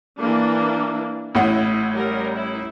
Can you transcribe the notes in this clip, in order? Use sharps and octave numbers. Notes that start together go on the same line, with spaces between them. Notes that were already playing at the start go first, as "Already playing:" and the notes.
E3 A#3 D4
A1 A2 E4 F#5
G3 A#4
E4